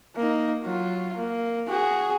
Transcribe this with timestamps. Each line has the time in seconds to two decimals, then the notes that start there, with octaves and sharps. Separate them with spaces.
0.16 A#3 D#4
0.63 F#3 F4
1.17 A#3
1.68 F#4 G#4